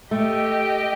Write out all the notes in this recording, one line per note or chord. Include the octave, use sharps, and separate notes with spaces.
A3 G4 D#5 G5